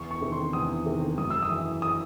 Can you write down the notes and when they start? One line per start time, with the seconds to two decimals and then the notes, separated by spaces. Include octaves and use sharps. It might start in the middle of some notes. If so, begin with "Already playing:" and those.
Already playing: E2 C#6
0.11 C#6
0.22 C3 D#3
0.32 C6
0.53 E2 D#6
0.86 C3 D#3
1.18 F#2 D#6
1.30 E6
1.42 D#6
1.50 E3
1.82 D#6